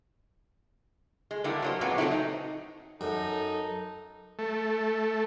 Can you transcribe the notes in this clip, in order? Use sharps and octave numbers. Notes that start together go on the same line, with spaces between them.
G#3
D3 G3 A3 A#3 E4
F#3 A#3 C5
A#2 F#3 G#3 B3 C4
F#3 A3 C4 E4
D#4
F#2 D#4 A4
A3